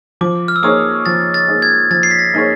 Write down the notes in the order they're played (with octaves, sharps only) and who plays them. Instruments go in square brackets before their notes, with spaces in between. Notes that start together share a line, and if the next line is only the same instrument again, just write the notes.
[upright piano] F3 [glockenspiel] D6
[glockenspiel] F6
E6
[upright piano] A#3 D#4 G#4 C#5 [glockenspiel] D#6
[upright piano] F3 [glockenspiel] A6
[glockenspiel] A6
[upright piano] A#3 D#4 G#4 C#5
[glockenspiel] G#6
[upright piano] F3 [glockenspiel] A6
[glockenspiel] C7
B6
A#6
[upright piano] A#3 D#4 G#4 C#5